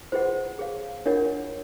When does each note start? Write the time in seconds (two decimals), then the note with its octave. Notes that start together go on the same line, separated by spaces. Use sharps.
0.12 F4 G#4 B4 C5 D#5 F#5
0.59 G#4 C#5 F5
1.06 D4 F4 A#4 C#5 D#5 F#5